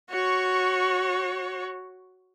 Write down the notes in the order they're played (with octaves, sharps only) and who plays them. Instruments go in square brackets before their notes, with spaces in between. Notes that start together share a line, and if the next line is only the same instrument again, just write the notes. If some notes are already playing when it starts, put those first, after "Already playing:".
[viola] F#4 C#5